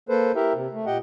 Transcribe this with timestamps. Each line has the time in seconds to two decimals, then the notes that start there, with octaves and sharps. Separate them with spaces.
0.09 A#3 A4 B4 C5
0.35 E4 G4 A#4 E5
0.55 C3
0.73 A3
0.86 A#2 G4 D#5 F#5 G5